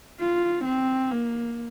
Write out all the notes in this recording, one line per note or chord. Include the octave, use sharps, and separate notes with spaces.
F4
C4
A#3